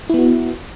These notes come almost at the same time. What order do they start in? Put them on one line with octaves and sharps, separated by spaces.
E4 B3 F#4